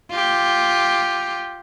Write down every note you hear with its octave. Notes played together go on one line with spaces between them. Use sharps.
F4 G4